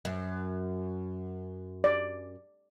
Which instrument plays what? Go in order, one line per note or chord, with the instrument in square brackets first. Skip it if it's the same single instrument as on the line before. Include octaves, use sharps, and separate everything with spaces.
[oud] F#2
[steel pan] D5